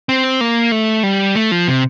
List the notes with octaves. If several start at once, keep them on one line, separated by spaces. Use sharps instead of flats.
C4
A#3
A3
G3
A3
F3
C3